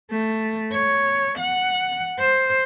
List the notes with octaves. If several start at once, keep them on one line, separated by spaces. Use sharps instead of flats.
A3
C#5
F#5
C5